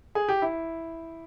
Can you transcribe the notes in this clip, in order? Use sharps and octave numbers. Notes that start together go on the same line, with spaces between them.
G#4
G4
E4